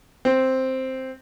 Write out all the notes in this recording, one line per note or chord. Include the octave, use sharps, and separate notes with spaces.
C4